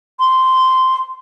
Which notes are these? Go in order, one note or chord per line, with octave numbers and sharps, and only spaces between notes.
C6